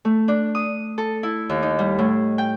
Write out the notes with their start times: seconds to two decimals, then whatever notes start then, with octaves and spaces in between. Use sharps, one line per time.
0.05 A3
0.28 D4
0.55 D#6
0.98 A4
1.23 E4
1.49 D#2
1.62 D#4
1.79 G3
1.98 A2
2.38 G5